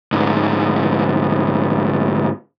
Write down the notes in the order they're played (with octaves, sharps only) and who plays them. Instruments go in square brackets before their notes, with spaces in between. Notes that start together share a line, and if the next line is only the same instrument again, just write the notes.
[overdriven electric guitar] D2 G#2